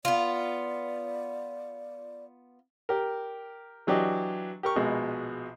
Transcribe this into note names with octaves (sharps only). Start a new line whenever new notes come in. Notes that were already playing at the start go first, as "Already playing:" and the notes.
B3 F4 D5
G4 A#4
E3 F#3 D4 G4 D#5
G4 A#4 C#6
A#1 B2 G#3